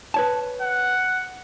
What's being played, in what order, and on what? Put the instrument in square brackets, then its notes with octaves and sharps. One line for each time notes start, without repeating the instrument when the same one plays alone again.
[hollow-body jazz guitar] B4 C#5 A5
[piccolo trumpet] F#5